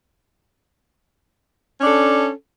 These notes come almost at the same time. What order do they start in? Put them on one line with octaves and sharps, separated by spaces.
C#4 D4 A4